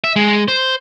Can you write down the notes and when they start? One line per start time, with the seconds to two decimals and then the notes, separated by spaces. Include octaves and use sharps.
0.04 E5
0.16 G#3
0.48 C5